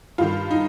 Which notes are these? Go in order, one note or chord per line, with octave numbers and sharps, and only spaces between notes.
G2 D#3 F4
D#4